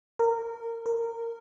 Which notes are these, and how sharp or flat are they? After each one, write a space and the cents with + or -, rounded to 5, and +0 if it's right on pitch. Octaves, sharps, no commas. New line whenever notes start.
A#4 -20
A#4 -15